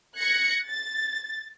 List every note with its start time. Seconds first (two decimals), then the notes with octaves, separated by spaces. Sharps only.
0.17 F#6 G#6 A#6 C#7
0.69 A6